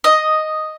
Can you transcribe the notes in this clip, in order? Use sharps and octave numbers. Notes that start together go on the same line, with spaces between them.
D#5